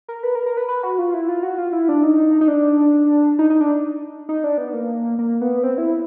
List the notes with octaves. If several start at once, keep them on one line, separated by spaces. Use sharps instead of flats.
A#4
B4
A#4
A#4
B4
B4
F#4
F4
E4
F4
F#4
F4
E4
D4
D#4
D#4
D4
D#4
D#4
D4
D#4
D4
B3
A#3
A#3
B3
C4
E4